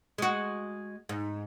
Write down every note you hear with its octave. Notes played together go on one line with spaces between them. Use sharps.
G#3 F#4
G#2